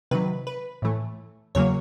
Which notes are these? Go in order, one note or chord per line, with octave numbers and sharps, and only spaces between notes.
C3 D#3 F#3 B4
B4
A2 E3 A3
E2 C#3 F#3 A#3 C#5